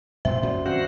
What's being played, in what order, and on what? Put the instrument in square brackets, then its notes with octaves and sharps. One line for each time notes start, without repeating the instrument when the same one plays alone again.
[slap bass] F#2 A#2 F#3 [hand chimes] C5 G5 C6 [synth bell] E5
[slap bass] F#2 [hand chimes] C#4 F#4 D5
[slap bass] D#3 C4 C#4 [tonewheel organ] F#4 C5 F#5 [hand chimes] F5